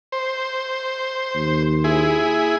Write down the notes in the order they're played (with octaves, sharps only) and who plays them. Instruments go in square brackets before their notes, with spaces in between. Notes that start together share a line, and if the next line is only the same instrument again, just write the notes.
[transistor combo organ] C5
[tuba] D#2
[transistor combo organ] E4 G#4